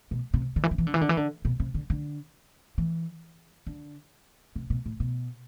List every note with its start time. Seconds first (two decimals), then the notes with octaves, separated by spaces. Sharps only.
0.11 B2
0.34 C3
0.56 D3
0.63 E3
0.71 D3
0.78 E3
0.87 D3
0.94 E3
1.01 D3
1.09 E3
1.17 D3
1.45 B2
1.60 C3
1.74 D3
1.90 D3
2.78 E3
3.67 D3
4.56 C3
4.70 B2
4.86 A2
5.00 B2